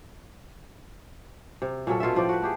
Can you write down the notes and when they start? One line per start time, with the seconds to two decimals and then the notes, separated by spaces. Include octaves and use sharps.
1.62 C3
1.87 A#2 F#3 C#4 A4
2.00 B2 F4 A4 E5
2.15 A2 F3 G4 D5
2.29 F#4 B4
2.42 A3 G4 G#4